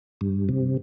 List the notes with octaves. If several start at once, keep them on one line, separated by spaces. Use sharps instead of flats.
G2
C3